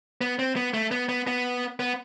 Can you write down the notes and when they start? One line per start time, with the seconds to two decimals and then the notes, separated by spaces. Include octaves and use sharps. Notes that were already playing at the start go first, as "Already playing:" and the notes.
0.21 B3
0.39 C4
0.56 B3
0.74 A3
0.91 B3
1.09 B3
1.27 B3
1.80 B3